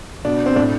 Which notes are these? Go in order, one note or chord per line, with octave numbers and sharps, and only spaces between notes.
B2 D4
C4
A2 D4